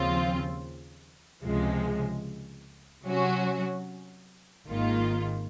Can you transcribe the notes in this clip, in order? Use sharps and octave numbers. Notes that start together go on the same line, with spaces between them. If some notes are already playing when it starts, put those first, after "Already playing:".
Already playing: D#2 C#3 F3 C4 F4
C#2 C3 F3 G#3
C3 F#3 C#4 F#4
G#1 G#2 D#3 A#3 F4